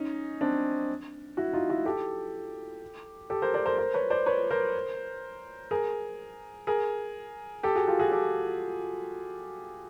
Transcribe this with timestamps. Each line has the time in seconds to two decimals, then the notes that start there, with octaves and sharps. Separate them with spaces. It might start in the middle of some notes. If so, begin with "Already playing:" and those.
Already playing: C#4 D#4
0.41 C4 D4
1.37 E4 F#4
1.53 D#4 F4
1.69 E4 F#4
1.85 G4 A4
3.30 G4 A4
3.42 A#4 C5
3.54 C5 D5
3.66 A#4 C5
3.78 A#4 C5
3.94 B4 C#5
4.10 C5 D5
4.26 B4 C#5
4.50 A#4 C5
5.71 G#4 A#4
6.67 G#4 A#4
7.63 G4 A4
7.75 F#4 G#4
7.87 F4 G4
8.00 F#4 G#4
8.12 G4 A4